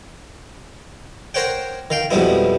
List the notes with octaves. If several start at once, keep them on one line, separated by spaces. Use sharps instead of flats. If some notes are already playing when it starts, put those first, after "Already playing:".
A#4 C5 C#5 F#5 G5
D#3 F5 G5
F2 G#2 B2 G3 B3 E4